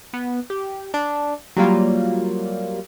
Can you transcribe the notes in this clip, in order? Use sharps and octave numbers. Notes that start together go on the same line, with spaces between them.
B3
G4
D4
F#3 G3 A#3 F4